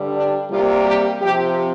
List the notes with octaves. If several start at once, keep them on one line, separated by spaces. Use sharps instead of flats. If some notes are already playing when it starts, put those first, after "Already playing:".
Already playing: G2 D3 G3
D4
C3 G3 A#3 F4
G4
C3 F3 C4 G4